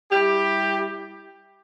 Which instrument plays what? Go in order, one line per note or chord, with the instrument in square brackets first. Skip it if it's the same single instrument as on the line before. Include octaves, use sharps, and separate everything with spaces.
[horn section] G3 E4 G4